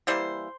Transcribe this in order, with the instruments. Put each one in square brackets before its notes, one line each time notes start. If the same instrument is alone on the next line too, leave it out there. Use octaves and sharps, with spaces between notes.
[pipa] E3 G3 A#3 C5